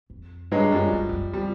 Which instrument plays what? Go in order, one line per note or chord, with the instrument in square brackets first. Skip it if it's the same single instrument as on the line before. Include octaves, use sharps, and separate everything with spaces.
[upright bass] F2
[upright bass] G2 [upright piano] F#3 G#3
[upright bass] F#2 [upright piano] F3 G3
[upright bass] F#2
F2
F#2
[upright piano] F3 G3